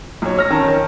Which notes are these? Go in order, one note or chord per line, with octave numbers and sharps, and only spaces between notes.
B1 C#5
C#5 F6 A#6
D#3 C#4 A5 A#5
D#3